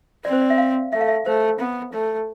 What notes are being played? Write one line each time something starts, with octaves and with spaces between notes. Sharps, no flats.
C4 D5
C5
D5
E5
F5
A3 E5
F5
E5
A3 C5
B3
A3